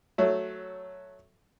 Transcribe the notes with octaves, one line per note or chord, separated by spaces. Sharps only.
F#3 A3